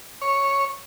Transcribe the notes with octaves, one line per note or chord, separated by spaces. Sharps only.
C#5